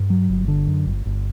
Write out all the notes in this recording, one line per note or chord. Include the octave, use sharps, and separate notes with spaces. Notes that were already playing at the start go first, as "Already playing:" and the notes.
Already playing: G2
F#3
G1
D3
F#2
G1
G1